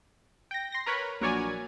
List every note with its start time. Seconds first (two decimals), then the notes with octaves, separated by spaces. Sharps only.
0.51 G5 A#6
0.72 C6 A#6
0.86 A#4 B4 C#5 B5
1.21 A#1 F#3 A#4 C#5 D5 G#5